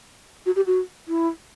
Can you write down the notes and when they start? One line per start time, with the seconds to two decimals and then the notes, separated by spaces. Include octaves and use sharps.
0.46 F#4
0.56 G4
0.67 F#4
1.08 E4